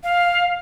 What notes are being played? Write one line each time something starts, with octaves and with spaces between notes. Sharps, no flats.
F5